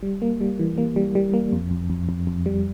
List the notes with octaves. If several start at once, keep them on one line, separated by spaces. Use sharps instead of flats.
G3
A#3
G3
E3
A#3
G3
G3
A#3
F2
F2
F2
F2
F2
G3